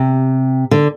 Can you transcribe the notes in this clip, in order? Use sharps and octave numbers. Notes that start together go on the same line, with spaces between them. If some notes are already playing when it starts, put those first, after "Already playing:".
Already playing: C3
D3